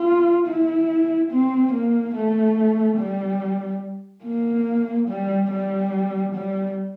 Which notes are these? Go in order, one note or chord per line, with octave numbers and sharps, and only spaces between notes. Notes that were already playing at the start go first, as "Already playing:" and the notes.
Already playing: F4
E4
C4
A#3
A3
G3
A#3
G3
G3
G3